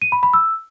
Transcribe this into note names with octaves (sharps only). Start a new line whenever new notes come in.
D#7
B5
B5
E6